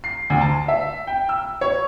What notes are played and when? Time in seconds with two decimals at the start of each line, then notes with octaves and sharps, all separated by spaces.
0.04 C7
0.30 D2
0.41 A5
0.68 E5
1.07 G5
1.29 E6
1.61 C#5